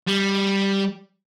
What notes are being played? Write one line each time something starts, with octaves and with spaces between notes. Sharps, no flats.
G3